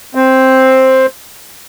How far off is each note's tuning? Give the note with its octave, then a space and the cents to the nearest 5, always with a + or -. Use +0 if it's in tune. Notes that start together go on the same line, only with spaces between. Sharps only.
C4 +5